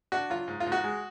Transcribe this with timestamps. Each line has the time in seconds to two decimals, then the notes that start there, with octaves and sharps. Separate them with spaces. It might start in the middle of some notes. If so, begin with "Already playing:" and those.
0.12 D4 F#4
0.30 F#3 F4
0.48 G#2
0.60 F4
0.66 G#2
0.72 F#4
0.84 G#3